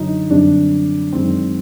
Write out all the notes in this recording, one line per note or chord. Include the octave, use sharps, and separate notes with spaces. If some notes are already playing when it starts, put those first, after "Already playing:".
Already playing: F#2 D3 F#3 D#4
F#2 D3 G3 C4 D4
F#2 D#3 G#3 C4